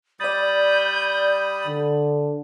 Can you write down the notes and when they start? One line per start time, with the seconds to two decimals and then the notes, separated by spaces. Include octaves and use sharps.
0.20 G3 D5 B5 D#6 G6 A6
1.67 D3